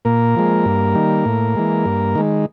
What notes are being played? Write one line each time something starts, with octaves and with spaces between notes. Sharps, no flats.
A#2 A#3 A#4
F3 G#3
G2
D#3 G3
A2
E3 G#3
G2
D#3 G#3